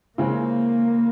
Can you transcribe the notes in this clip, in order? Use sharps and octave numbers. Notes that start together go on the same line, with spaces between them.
C#3 E3 G#3 A#3 C4